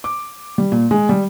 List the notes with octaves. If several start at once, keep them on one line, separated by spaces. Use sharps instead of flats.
D6
G3
A#2
G#3
G3